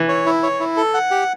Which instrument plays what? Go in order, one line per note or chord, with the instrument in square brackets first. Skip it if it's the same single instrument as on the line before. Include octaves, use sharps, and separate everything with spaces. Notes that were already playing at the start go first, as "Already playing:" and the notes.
Already playing: [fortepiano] E3
[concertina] C#5
E4
C#5
E4
A4
F#5
G4